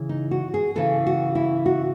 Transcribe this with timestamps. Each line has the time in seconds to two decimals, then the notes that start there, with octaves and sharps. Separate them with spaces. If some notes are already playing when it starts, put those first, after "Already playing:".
Already playing: C#3 E3
0.09 D#4
0.31 F#4
0.54 G#4
0.75 C#3 E3 A4
1.07 F#4
1.35 E4
1.66 F#4